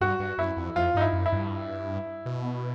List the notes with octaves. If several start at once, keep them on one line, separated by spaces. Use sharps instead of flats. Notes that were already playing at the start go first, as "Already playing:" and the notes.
G2 F#4
G2
F#2 E4
F2
F2 F4
G2 D#4
E4
F#2
E4
G2
B2